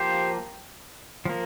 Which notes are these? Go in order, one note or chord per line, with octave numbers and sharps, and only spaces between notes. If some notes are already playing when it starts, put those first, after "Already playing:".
Already playing: F3 A#3 G4 C5
F3 A#3